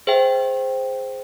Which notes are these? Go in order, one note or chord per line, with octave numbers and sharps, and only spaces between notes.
G#4 C5 E5 G5